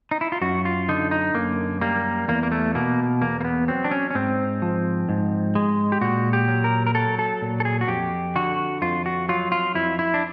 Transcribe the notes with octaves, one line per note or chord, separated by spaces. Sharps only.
D#4
E4
F4
F#2 F#4
F4
D3 D#4
D#4
F#2 A#3
G3 A#3
E2 A#3
A#3
A3
B2 A#3
E2 A#3
A#3
B3
F#3 C4
D4
C#4
C#4
G#2 C4
F3
G#2
G#3
G4
A#2 F#4
G4
F#3
A#4
A#4
F#3 A4
A4
A#2
A4
G#4
F#4
F2 G4
D3 F#4
F2 F4
F#4
F#3 F4
F4
F2 E4
E4
D4